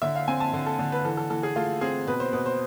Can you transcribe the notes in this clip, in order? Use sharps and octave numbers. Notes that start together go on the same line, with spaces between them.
D3 E5
F5
C4 G#5
A5
D3
A4
D3
B4
E3 A4
A4
E3 A4
G#4
A3 F4
C4 G#4
B2 B4
C5
B2 B4
C5